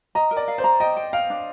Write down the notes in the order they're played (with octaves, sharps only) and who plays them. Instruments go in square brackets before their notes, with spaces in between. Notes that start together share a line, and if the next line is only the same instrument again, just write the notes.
[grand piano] D#5 [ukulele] A#5
[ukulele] A#4
[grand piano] D5
[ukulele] F5
[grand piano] C5
[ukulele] A#5
[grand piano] D#5 [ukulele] G5
[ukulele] G5
[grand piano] F5 [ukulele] G5
[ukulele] D4